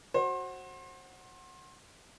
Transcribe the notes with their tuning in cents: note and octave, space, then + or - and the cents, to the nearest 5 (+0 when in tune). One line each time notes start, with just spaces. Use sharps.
F#4 +0 C5 +30